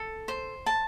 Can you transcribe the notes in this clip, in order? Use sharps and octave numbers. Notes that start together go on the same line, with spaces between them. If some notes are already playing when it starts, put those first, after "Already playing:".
Already playing: A4
C5
A5